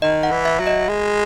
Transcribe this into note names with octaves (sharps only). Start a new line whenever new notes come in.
D#3 D#5
F#5
E3
E5
F#3
D#5
G#3